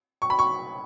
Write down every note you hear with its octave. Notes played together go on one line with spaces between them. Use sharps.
C#6
B5
C#6